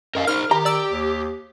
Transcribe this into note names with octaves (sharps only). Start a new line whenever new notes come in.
F#2 A#4 D#5 F5
D#4 A#4 C5 F6
D#3 G4 A#5
D5 E6 D7
D#2